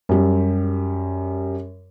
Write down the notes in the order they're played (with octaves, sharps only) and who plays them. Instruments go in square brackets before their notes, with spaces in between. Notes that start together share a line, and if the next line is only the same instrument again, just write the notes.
[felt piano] F#2 G3